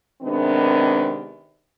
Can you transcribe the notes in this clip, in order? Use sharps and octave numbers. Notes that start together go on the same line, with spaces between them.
C3 D#3 G#3 B3 C4 D4